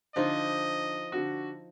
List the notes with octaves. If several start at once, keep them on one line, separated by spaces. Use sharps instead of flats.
D3 F3 D#4 F4 D#5
D3 F#4